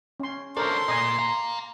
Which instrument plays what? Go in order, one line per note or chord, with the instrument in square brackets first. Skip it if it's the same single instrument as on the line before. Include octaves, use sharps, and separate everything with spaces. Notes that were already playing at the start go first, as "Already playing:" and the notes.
[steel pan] C#4 C6
[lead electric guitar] C#4 D4 [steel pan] A4 A#4 C5 [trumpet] C6
[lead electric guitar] A#2 [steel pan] D#5 G#5
[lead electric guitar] F5 A#5